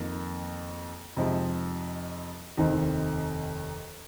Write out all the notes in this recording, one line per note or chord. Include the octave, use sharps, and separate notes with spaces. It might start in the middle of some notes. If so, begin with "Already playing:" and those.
Already playing: F2 D#3 A#3
F2 C3 F3 G#3 D#4
F1 D#2 D#3 C4